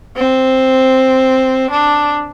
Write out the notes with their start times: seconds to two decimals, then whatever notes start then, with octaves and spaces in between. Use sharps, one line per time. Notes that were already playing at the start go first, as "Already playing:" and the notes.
0.17 C4
1.71 D4